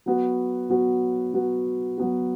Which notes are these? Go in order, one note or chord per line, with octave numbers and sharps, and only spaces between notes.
F#3 B3 F#4
F#3 B3 F#4
F#3 B3 F#4
F#3 B3 F#4